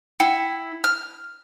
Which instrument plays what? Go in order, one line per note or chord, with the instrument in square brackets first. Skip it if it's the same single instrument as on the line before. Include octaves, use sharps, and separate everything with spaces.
[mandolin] E4 [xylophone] F#5 G5 C#7
[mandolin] F6